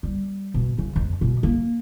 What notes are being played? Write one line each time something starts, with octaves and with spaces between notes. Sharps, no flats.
G3
B2
C#3
F2
B2
A#3